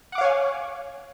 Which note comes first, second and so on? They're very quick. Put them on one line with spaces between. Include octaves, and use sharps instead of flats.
F#5 D6 F5 C#5 G#5